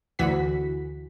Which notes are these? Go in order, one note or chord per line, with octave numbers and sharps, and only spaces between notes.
D2 E3 F#4 B6